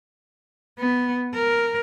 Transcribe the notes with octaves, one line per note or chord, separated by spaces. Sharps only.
B3
A#4